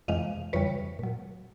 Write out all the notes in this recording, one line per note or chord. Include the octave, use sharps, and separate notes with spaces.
F2 C3 E3 G#3 D#5 F5
F2 C#3 E3 G3 B4 C#5
A#2 F#3